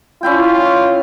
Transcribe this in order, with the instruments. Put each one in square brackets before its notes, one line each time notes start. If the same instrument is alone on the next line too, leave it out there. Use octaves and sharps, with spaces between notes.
[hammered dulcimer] C#4 E4 G5 [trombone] F4